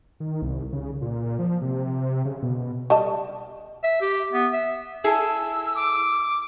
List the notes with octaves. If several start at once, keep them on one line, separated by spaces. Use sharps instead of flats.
D#3
C2
C#3
A#2
F3
C3
C#3
B2
G3 D#5 A5
E5
G4
B3
E5
E4 G#4 A4 E6
D6